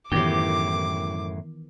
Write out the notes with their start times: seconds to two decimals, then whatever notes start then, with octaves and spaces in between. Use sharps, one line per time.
0.12 F#2 A2 D#3 E3 B3 G4 D6